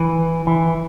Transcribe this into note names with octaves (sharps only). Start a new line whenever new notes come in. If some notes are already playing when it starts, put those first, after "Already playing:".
Already playing: E3
E3